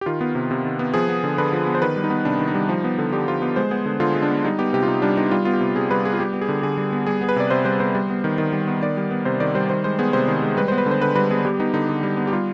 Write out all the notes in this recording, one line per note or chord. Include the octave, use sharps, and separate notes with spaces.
G4
D#3 F4
B3
C3
C3
D#3
B3
F3 G#4
B3
D3
D3 B4
F3
B3
C5
D#3 B4
G3
D#4
B3
C3 D4
D#3
D#4
G3
F3
B3
D3
D3 G4
F3 F4
B3
G#3 C5
B3 G#4
D3
D3 F4
G#3
D4
B3
G3 D#4
B3 G4
C3 G4
F4
C3 D#4
G3 D4
B3 D#4
G3 F4
B3 F4
G4
C3
C3 G#4
G3 B4
B3 G#4
F4
G3 G4
B3
G#4
D3
D3 G#4
G3
B3
G3 G#4
B3 G#4
B4
C3 D5
C3 C5
G3 C5
B3 C5
G3
B3
D#3
D#3
G3
B3
D#3 D5
G3
B3
C3 C5
D#3 D5
G3 C5
D#3 C5
G#3 C5
B3 G#4
C3 C5
D#3
G#3
G3 B4
B3 C5
B4
D3
C5
D3 B4
G3 B4
B3 G#4
G3 G4
B3 D#4
D3 D#4
D3
G3
B3
G4
G3 F4